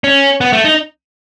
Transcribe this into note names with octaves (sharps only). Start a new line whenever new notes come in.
C#4
B3
A3
D#4